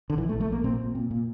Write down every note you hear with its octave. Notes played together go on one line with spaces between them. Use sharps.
D3
A#1 E3
A3
A#1
A3
A#1 A#3
A#2 C4
A#2
A#2
A#2